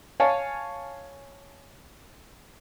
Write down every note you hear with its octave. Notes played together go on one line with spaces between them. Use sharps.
C#5 F5 G#5 A5